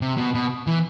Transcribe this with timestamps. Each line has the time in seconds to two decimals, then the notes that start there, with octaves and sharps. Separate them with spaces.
0.01 C3
0.18 B2
0.34 B2
0.67 E3